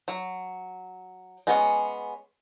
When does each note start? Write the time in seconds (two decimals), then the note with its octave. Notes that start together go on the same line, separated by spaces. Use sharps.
0.08 F#3
1.47 G#3 B3 C#4 F#4